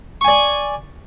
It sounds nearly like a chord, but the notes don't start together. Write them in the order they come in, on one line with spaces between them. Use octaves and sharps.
C#6 G#5 D5